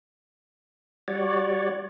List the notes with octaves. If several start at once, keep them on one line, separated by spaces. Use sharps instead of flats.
G3 F#4 C#5 D5